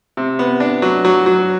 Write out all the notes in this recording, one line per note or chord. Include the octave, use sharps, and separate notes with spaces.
C3
B3
D4
F#3
F#3
F#3